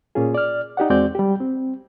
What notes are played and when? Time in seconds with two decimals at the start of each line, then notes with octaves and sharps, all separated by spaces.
0.15 A#2 A#3 C#4 F4 G#4
0.34 D5 F6
0.77 D#4 G4 D5 F#5
0.90 E2 G#3 C4 F#4 D5 G6
1.15 G3 G4
1.40 C4